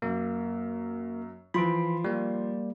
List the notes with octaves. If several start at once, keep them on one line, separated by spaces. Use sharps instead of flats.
F#2 A#3
E3 F3 B5 C6 D7
G3 A#3